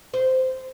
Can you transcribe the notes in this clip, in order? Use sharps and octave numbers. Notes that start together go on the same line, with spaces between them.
C5